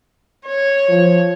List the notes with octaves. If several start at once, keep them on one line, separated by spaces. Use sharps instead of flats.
C#5
F3